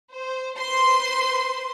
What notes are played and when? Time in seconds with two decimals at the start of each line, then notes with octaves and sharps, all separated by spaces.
0.13 C5
0.59 B4 C5 C6